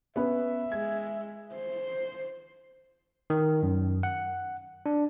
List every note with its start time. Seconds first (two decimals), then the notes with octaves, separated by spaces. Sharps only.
0.16 B3 C#4 B4 E5
0.72 G#3 G#6
1.54 C5
3.30 D#3
3.63 F#2
4.03 F#5
4.86 D4